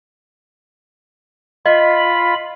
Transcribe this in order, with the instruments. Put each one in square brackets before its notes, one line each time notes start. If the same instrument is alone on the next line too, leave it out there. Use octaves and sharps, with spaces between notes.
[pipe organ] F4 B5 [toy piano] D#5